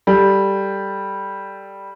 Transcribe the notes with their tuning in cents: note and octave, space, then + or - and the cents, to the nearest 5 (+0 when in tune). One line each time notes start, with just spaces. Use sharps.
G3 +0 A4 +0